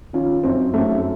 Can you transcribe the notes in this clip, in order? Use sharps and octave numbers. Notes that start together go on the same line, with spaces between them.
D#3 C#4 F4
F#2 C4 D#4
F#2 A3